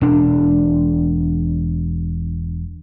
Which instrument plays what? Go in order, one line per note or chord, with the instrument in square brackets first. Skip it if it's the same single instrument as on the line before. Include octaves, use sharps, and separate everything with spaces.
[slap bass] E1 D4